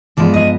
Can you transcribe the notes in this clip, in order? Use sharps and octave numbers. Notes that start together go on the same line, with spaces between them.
G2 F3 G#3 B3 D5
D#5